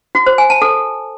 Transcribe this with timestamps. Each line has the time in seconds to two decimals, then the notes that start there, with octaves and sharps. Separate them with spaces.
0.15 F#4
0.26 C5
0.38 G#5
0.50 A5
0.62 A4